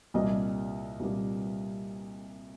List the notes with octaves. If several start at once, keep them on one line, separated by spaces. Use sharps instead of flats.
C2 A#2 G3 A#3 D#5
C2 A#2 G3 A#3